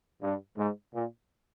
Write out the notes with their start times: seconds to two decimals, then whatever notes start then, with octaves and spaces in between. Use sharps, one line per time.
0.22 G2
0.58 G#2
0.94 A#2